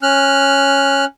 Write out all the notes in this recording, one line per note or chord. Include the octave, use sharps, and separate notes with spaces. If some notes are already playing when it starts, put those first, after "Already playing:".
C#4 F6 F#6